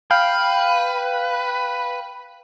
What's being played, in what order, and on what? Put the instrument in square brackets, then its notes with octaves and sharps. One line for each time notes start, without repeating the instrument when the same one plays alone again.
[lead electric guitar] B4 [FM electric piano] F5 G5